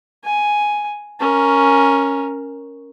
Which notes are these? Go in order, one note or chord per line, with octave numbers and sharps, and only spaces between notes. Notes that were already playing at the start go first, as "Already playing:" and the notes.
G#5
C#4 A#4